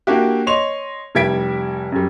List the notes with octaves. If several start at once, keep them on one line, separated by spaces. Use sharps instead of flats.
A#3 D4 E4 F#4 G4
C#5 D#5 C6 F7
F1 G3 E4 G#6 B6 D7
F#2 G3